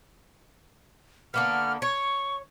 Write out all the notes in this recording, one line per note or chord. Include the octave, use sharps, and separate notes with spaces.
D3 A#3 B3 F6
C#5 C#6